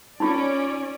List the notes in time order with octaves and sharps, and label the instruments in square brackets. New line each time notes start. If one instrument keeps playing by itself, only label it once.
[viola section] C#4 D5 [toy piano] D#4 F4